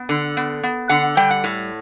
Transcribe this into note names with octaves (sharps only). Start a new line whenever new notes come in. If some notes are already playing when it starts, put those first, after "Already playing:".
Already playing: B3
D3
B3
B3
D3 F#5
G3 G5
F#5
A2